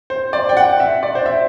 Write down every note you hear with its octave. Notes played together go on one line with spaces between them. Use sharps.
C5
D5
G5
F#5
E5
D5
C5
E5